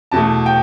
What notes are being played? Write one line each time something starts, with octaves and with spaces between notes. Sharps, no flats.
E2 B2 A3 A5
G5